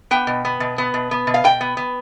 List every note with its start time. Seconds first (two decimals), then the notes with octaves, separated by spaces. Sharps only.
0.11 B3 G5
0.27 B2
0.45 B3
0.60 B2
0.78 B3
0.94 B2
1.11 B3
1.27 B2
1.34 F5
1.44 B2 G5
1.61 B3
1.77 B3